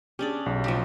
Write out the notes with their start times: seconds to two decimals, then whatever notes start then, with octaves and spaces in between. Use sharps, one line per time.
0.19 C#4 D4 G4 G#4 D5
0.46 B1
0.64 F3 A3 G4